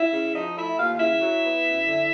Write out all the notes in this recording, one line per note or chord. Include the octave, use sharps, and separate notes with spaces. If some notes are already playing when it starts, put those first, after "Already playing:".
Already playing: E4 E5
C#3
F3 D#4 D#5
A3 E4 E5
D#2 F4 F5
C#3 E4 E5
F#3
B3
F#2
D3